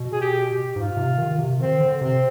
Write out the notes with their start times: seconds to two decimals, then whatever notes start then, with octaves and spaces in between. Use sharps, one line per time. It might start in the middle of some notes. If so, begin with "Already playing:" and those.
Already playing: B2
0.13 G#4
0.21 G4
0.48 G4
0.76 G#2 F4
0.97 C3
1.18 D#3
1.39 C3
1.60 D#3 C4
1.80 D3
2.01 C3 C4